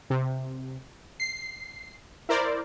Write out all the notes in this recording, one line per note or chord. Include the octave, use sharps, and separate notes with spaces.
C3
C7
E4 A#4 C5 D5